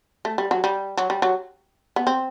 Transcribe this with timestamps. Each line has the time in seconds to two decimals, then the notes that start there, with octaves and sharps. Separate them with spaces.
0.25 A3
0.38 G3
0.51 F#3
0.64 G3
0.97 F#3
1.10 G3
1.22 F#3
1.96 B3
2.07 C4